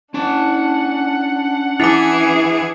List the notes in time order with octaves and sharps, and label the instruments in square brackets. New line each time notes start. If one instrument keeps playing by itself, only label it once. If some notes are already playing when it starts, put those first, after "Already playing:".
[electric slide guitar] C#4 A5 [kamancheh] D4 F#5
[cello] E3 G#4 [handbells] E4 D6